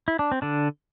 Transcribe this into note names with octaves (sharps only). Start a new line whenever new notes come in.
E4
D4
C4
D3 D4